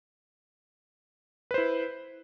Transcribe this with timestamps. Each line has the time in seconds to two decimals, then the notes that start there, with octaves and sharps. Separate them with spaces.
1.51 B4
1.54 C5
1.58 E4